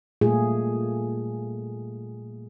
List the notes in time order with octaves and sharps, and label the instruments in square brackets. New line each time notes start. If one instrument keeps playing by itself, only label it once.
[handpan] A#2 G3 A3 F4 G#4